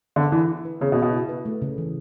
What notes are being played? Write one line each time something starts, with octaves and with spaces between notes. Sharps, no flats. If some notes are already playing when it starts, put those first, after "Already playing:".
D3 B3
E3 E4
E4
B4
C#3 B3
B2
B3
B2
E4
B4
A3
C#3
E3